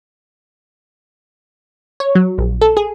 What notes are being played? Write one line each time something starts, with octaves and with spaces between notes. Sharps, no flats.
C#5
F#3
A#1
A4
G#4